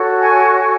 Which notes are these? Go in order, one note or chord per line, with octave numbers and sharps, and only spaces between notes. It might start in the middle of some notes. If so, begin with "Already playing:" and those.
Already playing: F#4 A4 C#5
G#5
G#5